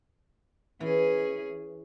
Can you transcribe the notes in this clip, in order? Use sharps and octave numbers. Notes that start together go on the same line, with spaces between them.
E3 C#4 G#4